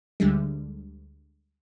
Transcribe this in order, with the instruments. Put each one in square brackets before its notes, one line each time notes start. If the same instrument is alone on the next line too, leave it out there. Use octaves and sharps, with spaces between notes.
[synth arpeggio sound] D2 D3 G3 G#3